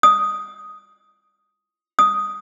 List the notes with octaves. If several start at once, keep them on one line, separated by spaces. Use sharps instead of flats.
D#6
D#6